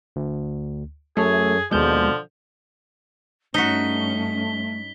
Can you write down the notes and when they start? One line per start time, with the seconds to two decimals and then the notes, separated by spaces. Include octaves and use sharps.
0.16 D2
1.17 F#2 A3 G#4 A4 C#5
1.71 D#2 B2 D3 F3 G#3 G6
3.54 G2 A3 C#4 D#4 F#4 B6 G7